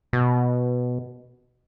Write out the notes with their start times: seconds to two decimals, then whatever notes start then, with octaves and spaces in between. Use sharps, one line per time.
0.13 B2